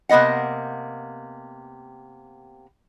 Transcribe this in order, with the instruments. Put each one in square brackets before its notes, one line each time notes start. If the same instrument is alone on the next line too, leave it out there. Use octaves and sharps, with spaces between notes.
[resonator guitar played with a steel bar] C3 A#3 B3 D#5 F#5